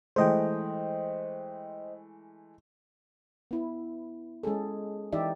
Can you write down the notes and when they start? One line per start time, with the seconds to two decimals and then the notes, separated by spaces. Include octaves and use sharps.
0.16 E3 G#3 A3 C5 D#5 G5
3.51 B3 E4
4.43 G#3 C#4 G#4 A4
5.12 E3 D#4 G4 D5 E5